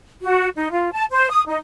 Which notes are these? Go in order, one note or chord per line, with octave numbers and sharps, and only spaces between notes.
F#4
D#4
F4
A5
C5
D#6
D#4